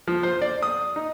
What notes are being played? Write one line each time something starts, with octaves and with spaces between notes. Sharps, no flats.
F3
C5
D5
D#6
D#4